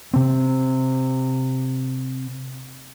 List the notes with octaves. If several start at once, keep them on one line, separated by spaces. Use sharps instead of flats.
C3 C4